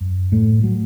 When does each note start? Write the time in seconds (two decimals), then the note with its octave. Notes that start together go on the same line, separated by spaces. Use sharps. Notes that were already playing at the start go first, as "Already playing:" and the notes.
0.01 F#2
0.32 A2 A3
0.63 F#3